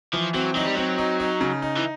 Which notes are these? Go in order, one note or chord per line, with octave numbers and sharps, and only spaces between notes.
E3 F3
F#3 C4
F#3 D#4
G3
F#3 C4
D#4
D#4
C#3
D#4
E3